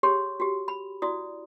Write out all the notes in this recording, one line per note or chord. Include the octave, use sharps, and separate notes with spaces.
G4 G#4 C#5 C6 C#6
F#4 G4
B5
E4 F#4 D5 D#6